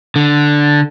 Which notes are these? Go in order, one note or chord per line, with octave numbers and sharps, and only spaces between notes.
D3